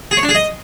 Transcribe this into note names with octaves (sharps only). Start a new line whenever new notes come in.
G#4
C#5
D4
G#4
D#5